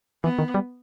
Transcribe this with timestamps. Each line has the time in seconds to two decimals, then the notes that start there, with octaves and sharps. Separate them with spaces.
0.24 E3 B3
0.39 D#3
0.54 G3